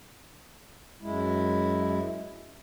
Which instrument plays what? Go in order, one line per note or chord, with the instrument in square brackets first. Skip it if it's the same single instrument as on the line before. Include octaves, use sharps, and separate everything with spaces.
[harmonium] F#2 G#3 E4